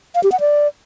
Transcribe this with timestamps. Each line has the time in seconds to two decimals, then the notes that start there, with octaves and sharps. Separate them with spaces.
0.15 F5
0.23 G4
0.32 F#5
0.40 D5